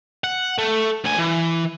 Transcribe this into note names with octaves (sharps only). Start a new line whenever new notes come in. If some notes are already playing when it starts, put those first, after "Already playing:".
F#5
A3
D2 G#5
E3